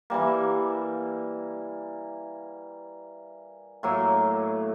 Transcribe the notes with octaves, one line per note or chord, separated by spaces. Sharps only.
E3 G3 A#3
A2 F#3 A#3